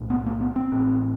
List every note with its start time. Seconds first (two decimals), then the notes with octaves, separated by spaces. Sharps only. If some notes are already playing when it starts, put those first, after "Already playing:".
Already playing: B1 A2
0.10 B3
0.26 A#3
0.41 B3
0.56 C4
0.72 A1 A2